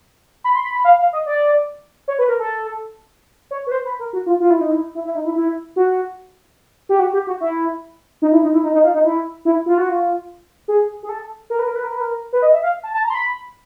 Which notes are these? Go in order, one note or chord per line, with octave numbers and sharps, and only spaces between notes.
B5
C6
B5
B5
F5
F5
D#5
D5
C#5
B4
A#4
A4
C#5
B4
C5
B4
A#4
F#4
F4
F4
E4
D#4
E4
E4
E4
D#4
E4
E4
F#4
G4
F#4
G4
F#4
E4
D#4
E4
D#4
E4
D#4
D#4
F4
D#4
E4
E4
F4
F#4
F4
G#4
G#4
A4
A#4
B4
A#4
B4
A#4
B4
A#4
B4
D#5
E5
F5
A5
A5
A#5
C6
B5